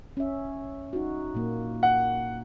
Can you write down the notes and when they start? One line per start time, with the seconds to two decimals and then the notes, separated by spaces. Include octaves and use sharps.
0.17 C#4 E5
0.93 D#4 F#4
1.35 A#2 A#3
1.83 F#5